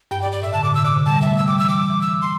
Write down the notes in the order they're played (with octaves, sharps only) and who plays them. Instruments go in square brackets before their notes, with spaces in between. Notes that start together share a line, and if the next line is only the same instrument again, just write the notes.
[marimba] G2 [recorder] G5
[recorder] D5
[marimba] G2
[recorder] D5
[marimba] A2 [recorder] E5
[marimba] D3 [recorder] A5
[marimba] A2 [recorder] D6
[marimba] C3 [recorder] E6
[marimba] D3 [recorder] D6
[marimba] C3
[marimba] G3 [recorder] A5
[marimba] G3
[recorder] E5
[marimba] A3
[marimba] G3 [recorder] E6
[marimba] G3 [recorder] D6
[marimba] E3 [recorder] E6
[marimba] G3 [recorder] D6
[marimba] E3
[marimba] E3 [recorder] E6
[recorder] C6